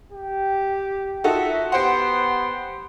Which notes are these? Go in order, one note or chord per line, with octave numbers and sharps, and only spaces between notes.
G4
D#4 F4 F#4 A4 E5
B3 G4 C5 F#5 C6